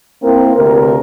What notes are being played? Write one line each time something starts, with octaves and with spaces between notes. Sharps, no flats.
A#3 C4 E4 A#4
D2 C3 A#4